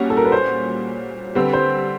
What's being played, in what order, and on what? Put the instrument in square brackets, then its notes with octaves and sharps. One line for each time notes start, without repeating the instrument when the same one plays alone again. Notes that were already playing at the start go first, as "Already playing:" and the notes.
Already playing: [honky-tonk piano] A#2 G3 C#4 F#4
[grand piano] A4
A#4
B4
C5
[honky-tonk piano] D3 G3 C4 [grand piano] B4
[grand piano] C5